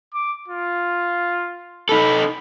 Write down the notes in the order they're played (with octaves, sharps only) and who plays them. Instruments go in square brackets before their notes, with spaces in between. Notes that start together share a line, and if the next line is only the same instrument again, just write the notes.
[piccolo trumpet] D6
F4
[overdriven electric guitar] D#4 A4 [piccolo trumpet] B5